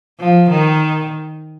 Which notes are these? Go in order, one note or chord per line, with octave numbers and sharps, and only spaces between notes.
F3
D#3